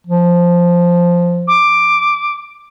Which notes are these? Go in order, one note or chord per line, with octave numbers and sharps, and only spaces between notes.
F3
D6